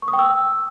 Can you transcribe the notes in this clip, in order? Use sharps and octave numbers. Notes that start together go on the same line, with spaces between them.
C#6
D#6
G5
E6